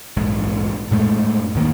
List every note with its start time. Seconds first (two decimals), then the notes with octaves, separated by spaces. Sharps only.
0.17 A#1 E2 G#2
0.91 F#2 A2 G#3 A3
1.55 E2 D#3 A#3